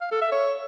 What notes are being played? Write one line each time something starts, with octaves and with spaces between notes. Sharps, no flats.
F5
A4
E5
C#5